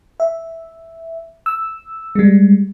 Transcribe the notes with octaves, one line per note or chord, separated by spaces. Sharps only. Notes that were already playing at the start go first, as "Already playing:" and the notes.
E5
E6
G3 G#3